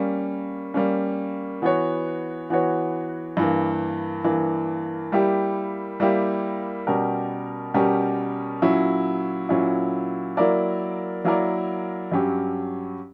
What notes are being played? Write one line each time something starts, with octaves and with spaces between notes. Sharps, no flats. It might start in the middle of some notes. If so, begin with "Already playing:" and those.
Already playing: G3 A#3 C#4
G3 A#3 C#4
E3 B3 F#4 C#5
E3 B3 F#4 C#5
G2 E3 A#3
G2 E3 A#3
G3 A#3 E4 G4
G3 A#3 E4 G4
B2 G3 C#4 G4 A#4
B2 G3 C#4 G4 A#4
A#2 F#3 C#4 E4
A#2 F#3 C#4 E4
F#3 A#3 E4 A#4 D5
F#3 A#3 E4 A#4 D5
G2 F#3 C#4 G4